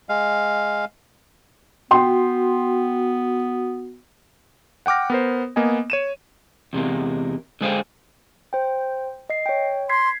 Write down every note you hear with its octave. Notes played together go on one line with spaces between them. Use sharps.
G#3 F5
B3 F#4 G5 C6
F#5 G5 D6 F6 A#6
B3 A#4 C5
A#3 B3 D#5 G#5
C#5 D#7 E7
E2 C3 G#3 A#3
D3 G#3 G#4 C5 F5 G5
C5 G5
D#5 C7
C#5 G5
C6 G#6 B6 C7